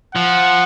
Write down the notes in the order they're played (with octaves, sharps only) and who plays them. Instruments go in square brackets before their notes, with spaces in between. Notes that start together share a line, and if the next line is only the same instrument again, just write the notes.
[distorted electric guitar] F3 [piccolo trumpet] F#5